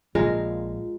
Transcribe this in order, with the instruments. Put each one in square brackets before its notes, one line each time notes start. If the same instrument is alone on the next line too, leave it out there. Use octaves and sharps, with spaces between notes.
[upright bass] A#1 [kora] G#3 A#4 [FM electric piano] F4